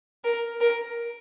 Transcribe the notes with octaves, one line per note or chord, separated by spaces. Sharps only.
A#4
A#4